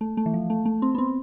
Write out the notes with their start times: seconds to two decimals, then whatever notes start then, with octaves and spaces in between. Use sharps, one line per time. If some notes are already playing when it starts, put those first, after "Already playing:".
0.01 A3
0.17 A3
0.26 E3
0.34 F3
0.50 A3
0.65 A3
0.82 C4
0.95 B3
0.98 C4